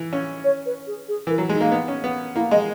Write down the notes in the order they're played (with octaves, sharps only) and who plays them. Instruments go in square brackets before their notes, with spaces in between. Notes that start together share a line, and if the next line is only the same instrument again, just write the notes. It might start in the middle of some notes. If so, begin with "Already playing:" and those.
Already playing: [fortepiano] E3
C#4
[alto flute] C#5
B4
G#4
G#4
[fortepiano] E3 [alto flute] A#4
[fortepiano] F#3
[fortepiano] G#3 [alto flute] D#4
[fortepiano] A#3
B3
C#4
B3
[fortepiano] A#3 [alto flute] E4
[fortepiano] G#3 [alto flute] D#5